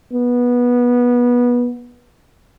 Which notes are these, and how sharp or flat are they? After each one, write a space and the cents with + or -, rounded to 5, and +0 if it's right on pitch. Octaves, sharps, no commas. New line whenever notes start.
B3 -20